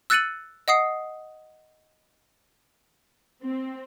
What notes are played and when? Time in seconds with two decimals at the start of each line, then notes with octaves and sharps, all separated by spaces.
0.10 E6 F#6 A6 C#7 D#7 F#7
0.68 D#5 F#5 D#6 C7
3.43 C4